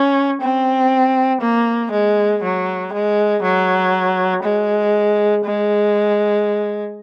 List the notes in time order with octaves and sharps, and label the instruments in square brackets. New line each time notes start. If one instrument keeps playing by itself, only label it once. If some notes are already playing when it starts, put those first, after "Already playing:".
Already playing: [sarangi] C#4
C4
A#3
G#3
F#3
G#3
F#3
G#3
G#3